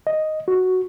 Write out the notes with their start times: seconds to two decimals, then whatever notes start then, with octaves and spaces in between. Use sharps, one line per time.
0.07 D#5
0.48 F#4